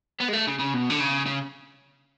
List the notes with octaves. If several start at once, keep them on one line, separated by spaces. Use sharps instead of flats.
B3
G#3
A3
C#3
C#3
B2
D3
C#3
C#3